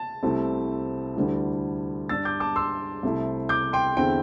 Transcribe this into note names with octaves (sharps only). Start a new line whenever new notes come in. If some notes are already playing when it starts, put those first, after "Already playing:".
Already playing: A5
C2 C3 A3 C4 E4
D2 D3 G3 E4
G2 G3 D4 E6 A6
D6 G6
A5 D6
C6 E6
C2 C3 A3 E4
D6 G6
G5 C6
E2 D3 C4 E4 G5